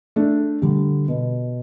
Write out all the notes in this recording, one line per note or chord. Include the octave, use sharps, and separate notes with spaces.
A3 D4
D3 G3
B2